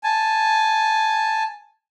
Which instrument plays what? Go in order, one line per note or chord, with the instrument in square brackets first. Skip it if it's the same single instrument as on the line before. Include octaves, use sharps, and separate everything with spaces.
[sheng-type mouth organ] G#5 A5